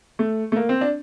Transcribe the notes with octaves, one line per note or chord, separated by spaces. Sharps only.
A3
A3
A#3
C4
D4